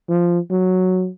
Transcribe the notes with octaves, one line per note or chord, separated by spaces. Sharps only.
F3
F#3